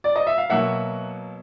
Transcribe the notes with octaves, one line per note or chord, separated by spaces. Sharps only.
D5
D#5
E5
F5
B2 F#3 A#3 E5 F#5